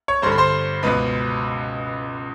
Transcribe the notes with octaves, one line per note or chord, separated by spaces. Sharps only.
C#5 C#6
G2 D3 C5 C6
B5
C5 C6
C#2 B2 B4 B5